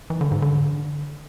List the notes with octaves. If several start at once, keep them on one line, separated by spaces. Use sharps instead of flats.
E3
D3
G#2
D3